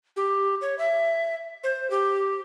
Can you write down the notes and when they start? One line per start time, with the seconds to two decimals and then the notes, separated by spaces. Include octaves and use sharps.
0.16 G4
0.61 C#5
0.78 E5
1.64 C5
1.91 G4